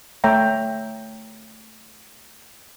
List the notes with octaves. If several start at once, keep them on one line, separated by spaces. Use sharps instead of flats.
A3 C#5 E5 G5 A#5